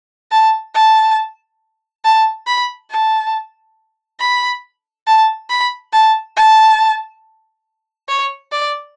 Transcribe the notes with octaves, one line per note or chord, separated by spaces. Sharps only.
A5
A5
A5
B5
A5
B5
A5
B5
A5
A5
C#5
D5